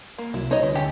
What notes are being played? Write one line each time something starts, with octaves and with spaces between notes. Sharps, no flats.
A#3
C2 F#3 E4
B3 D#4 C#5 D#5
D2 E4
D2 C#4 G4 A4